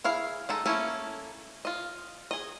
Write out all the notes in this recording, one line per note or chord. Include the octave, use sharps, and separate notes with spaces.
E4 G#4 F5
G#3 D#4 A4
A3 A#3 C#4 E4
F4 D#5
G#4 D#5